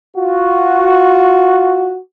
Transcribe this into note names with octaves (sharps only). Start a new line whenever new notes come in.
F4 F#4